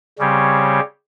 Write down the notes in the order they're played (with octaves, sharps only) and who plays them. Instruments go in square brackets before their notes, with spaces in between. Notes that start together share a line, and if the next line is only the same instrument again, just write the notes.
[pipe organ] C#3 G3 C4 G4 C#5